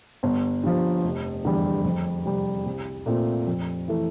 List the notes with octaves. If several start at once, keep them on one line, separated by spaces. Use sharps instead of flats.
G1
G2 F3
F1
E2 D3 G3
F2
C3 G3
C2
A#2 A3 C4 F4
F2
E3 A3